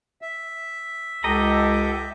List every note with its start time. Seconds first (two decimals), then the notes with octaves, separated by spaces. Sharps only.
0.22 E5
1.24 C#2 G4 A4 D#5 A#5